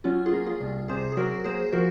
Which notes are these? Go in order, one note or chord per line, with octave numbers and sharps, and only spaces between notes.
F#3 C#4 F4
F4 G#4
A#3
F4 G#4
C2
C3 G#4 C5
G#4
F#3 F#4 A#4
A#3 G#4 C5
F3 F#4 A#4